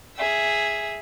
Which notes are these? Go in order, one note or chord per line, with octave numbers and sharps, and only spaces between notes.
G#4 E5